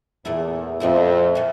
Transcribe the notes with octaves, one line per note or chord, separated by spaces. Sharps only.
E2 A#2 A3 E4
F2 A#2 A3 E4
A#2 A3